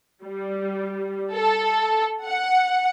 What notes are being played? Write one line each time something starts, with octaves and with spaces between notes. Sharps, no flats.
G3
A4
F#5